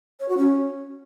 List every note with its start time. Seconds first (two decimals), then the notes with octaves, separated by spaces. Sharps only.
0.20 C#5
0.29 F#4
0.38 C#4